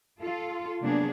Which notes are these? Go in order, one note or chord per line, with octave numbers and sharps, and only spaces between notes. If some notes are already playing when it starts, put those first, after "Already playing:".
F4 A4
C3 F#3 A#3 B3 D4 G#4